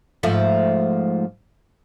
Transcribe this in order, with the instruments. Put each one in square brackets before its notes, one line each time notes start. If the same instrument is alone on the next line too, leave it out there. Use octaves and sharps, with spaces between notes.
[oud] G#2 F3 A3